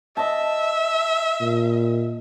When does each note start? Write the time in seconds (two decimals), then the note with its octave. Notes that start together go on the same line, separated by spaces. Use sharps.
0.17 D#5 E5 A5
1.40 A#2